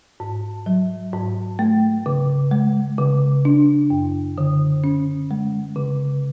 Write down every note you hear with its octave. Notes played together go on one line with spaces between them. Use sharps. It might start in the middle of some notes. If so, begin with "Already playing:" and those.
G#2
F#3
G#2
A3
C#3
G#3
C#3
D4
F#2
D3
C#4
G#3
C#3